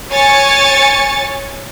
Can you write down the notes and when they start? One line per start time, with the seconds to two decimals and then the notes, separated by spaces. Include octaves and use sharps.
0.10 C#5 G#5 A6 C#7